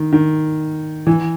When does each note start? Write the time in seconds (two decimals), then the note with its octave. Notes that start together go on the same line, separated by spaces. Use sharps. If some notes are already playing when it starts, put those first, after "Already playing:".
Already playing: D#3
0.13 D#3
1.07 E3